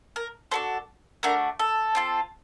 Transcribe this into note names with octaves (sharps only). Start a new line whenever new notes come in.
A#4
D4 F#4 A4 C5
A3 D4 F#4 A#4
A4
C4 F4 A4